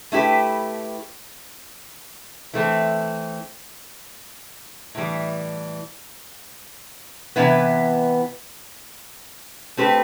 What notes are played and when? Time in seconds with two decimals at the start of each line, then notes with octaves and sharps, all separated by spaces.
0.12 A3 E4 G4 B4
2.54 E3 A3 C4
4.95 A2 E3 G3
7.36 C3 E3 B3 E4 B4
9.77 A3 C4 G4 B4